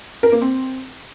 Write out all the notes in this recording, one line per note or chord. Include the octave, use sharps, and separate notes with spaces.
A#4
A#3
C4